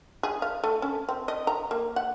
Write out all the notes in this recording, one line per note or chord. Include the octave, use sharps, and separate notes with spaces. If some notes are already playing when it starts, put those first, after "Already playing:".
G#4
F5
A3
C#4
C4
D#5
A#5
A#3
F#5